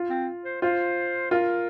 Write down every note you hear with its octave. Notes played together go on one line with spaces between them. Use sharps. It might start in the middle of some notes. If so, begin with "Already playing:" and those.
Already playing: F4
C4
C5
F4 C5
F4 A#4